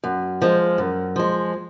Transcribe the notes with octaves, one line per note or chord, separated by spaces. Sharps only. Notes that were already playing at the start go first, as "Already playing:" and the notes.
F#2
F3 G#3
F#2
F3 G#3